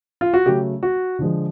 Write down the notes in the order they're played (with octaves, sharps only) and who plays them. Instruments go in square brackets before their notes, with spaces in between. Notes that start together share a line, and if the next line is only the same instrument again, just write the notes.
[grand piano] F4
F#4
C#3 F#3 A3 G4
F#4
D3 F3 G#3